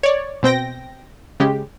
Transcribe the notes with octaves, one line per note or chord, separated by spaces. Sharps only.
C#5 D5
B2 C4 G5 A#6
C#3 G#3 G4